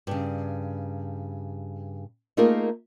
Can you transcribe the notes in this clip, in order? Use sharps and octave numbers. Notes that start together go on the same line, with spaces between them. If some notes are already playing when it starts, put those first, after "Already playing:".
G2 C#3
A3 A#3 D#4 F4 G#4 A#4